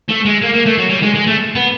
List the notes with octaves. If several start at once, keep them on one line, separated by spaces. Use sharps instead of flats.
A3
G#3
A#3
A#3
A3
F#3
G3
G#3
G#3
A3
B3